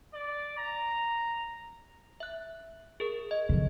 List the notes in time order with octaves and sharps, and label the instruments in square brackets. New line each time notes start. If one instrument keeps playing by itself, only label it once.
[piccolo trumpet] D5
A#5
[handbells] E5 F#6
G#4 A#4
D#5
[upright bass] D3 F#3